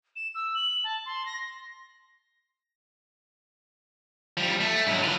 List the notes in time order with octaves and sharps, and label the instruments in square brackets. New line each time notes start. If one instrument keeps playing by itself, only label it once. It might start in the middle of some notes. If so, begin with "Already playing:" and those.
[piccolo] E7
E6
F#7
A5
C6
A#6
[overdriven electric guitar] F3 G3
A3
G#2 F#3
F4 B4